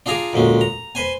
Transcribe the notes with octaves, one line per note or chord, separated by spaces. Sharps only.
D4 F4 G#4 G#5 A#5 D6
D2 A#2 G#3 C#4
A#5
B4 C5 G#5